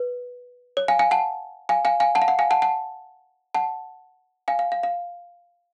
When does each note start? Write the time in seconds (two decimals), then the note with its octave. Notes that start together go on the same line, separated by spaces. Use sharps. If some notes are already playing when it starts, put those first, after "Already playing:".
Already playing: B4
0.77 C#5
0.88 F5 G#5
0.99 F5 G#5
1.11 F#5 A5
1.69 F5 G#5
1.85 F5 G#5
2.00 F5 G#5
2.15 F#5 A5
2.22 F5
2.28 F#5
2.39 F5 G#5
2.51 F#5 A5
2.62 F#5 A5
3.54 F#5 A5
4.48 F5 G#5
4.59 F5
4.72 F5
4.83 F5